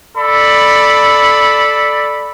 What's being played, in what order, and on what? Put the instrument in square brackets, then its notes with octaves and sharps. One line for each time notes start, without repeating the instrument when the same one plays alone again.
[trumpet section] A4 D5 B5